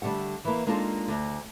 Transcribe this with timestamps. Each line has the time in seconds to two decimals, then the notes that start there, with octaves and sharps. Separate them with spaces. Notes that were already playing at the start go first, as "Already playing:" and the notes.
0.02 D3 G3 A3 F#5
0.45 E3 A#3
0.67 G#3 A#3 D4 D#4 F4 A4
1.08 D2